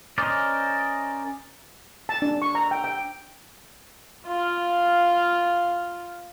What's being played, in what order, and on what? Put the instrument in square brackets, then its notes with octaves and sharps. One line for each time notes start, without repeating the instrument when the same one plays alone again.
[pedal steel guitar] C#4 A#4 C5 D5 D#5
[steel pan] A5
D4
C#6
A#5
G5
G5
[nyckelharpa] F4 F5